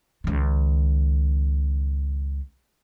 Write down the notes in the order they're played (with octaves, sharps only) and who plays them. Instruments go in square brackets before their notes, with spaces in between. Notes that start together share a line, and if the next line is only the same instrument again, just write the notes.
[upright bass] C#2 D#3